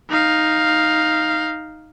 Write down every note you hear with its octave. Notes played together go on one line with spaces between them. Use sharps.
D#4 F5